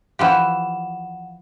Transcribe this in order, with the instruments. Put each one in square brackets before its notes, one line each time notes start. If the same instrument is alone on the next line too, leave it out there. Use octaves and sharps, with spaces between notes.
[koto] E3 F3 G4 [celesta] F5 F#5 E7